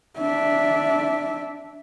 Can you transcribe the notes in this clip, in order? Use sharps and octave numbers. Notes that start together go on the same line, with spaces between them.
D4 E5